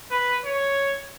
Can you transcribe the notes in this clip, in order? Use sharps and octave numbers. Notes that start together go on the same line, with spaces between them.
B4
C#5